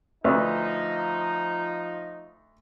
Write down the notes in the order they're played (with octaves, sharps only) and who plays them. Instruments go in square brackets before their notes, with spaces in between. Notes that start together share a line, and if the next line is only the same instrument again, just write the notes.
[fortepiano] D2 B4 C#6 [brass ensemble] F3 D#4